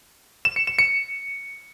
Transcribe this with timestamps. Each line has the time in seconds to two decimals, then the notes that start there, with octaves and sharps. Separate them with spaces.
0.45 E7
0.56 C#7
0.67 E7
0.79 C#7